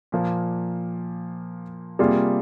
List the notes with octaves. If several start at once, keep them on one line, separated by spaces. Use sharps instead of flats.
A#2 F3 A#3
C3 G3 A#3 F4 G#4